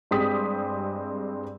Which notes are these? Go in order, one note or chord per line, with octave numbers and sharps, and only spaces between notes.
G2 G#3 C4 G4 D#6 B6